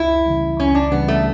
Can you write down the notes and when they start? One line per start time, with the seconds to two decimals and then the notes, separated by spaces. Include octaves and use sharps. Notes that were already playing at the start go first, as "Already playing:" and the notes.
Already playing: C#2 E4
0.26 C#3 E3 G3
0.59 C#2 C#4
0.75 D4
0.92 C#3 E3 G3 B3
1.08 A3